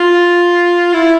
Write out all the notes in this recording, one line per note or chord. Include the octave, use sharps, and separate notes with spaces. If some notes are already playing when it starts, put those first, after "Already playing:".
Already playing: F4
E4